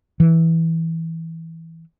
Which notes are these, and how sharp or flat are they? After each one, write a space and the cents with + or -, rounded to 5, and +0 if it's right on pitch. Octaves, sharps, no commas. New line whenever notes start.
E3 -10